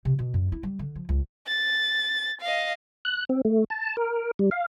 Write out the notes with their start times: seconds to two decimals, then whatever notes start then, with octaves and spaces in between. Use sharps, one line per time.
0.05 C3
0.19 B2
0.34 F#2
0.52 E4
0.63 G3
0.79 D3
0.95 F3
1.09 C#2
1.47 A6
2.41 D#5 F5
3.05 F#6
3.29 C4
3.45 A3
3.70 A5
3.97 A#4
4.39 G3
4.51 F5